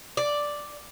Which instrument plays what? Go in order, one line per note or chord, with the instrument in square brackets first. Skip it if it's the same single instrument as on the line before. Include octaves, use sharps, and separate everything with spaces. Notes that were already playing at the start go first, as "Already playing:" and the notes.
[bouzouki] D5